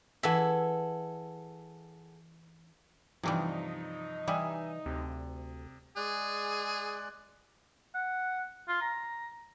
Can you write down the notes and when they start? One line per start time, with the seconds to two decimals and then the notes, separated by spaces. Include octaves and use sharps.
0.23 E3 G#4 A4 E5 F#5
3.23 G2 C3 E3 F3 G3 D#4
4.28 E3 G3 E5 G#5 D#6
4.86 D2 C3
5.96 G#3 G#4 D5 F#6
7.94 F#5
8.68 F4
8.82 A#5